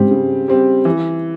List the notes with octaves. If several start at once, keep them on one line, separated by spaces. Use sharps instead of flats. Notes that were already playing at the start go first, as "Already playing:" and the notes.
Already playing: G#2 C#3 G3 C4 G4
C#3
G3 C4 G4
E3